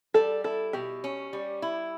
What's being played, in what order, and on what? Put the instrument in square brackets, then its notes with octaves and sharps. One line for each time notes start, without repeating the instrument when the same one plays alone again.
[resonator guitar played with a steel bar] G3 [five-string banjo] A4
[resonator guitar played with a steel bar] E4 [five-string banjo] A4
[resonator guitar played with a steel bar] B2 [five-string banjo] G4
[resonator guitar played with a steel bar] C#4
G3
E4